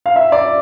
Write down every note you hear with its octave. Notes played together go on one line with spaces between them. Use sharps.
F5
E5
D5